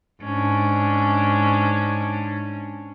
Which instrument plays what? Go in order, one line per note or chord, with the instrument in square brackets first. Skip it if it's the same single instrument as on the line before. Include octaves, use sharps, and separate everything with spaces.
[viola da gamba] G#2 C#4 D4